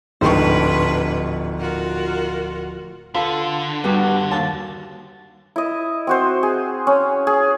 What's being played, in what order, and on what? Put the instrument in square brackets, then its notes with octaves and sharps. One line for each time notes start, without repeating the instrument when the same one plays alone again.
[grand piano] D1 [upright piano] G#2 C#6 [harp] F3 G4 C5 [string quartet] D4 B4
[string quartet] F4 F#4 A#4
[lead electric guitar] D3 [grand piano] F4 A4 [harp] B4 B5
[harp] G2 F#4 [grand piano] B3 G4
[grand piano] D#2 [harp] A5
[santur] E4 D#5
C4 F#4 C5
G#4
C#4
G#4